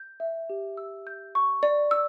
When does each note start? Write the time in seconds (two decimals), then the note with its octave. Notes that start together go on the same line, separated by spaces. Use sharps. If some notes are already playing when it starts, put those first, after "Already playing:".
Already playing: G6
0.20 E5
0.50 G4
0.77 E6
1.07 G6
1.35 C#6
1.63 D5
1.91 E6